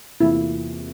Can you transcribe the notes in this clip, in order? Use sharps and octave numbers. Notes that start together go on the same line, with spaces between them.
E2 C3 E3 A#3 E4 F4